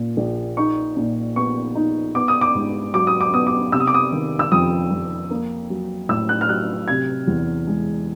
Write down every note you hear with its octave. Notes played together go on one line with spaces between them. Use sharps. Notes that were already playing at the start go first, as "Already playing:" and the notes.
Already playing: A#2
A#1
D#4 C#6
A#2
B3 C#6
D#4
B3 D6
D#6
D6
G#2
F#3 D6
D#6
D6
B3 D#6
D6
C3 E6
D#6
D6
D#6
D#3
E6
F2 D#6
F2
A#3
F#3
A2 E6
F#6
F6
F#3 F#6
C3 G#6
E2
G#3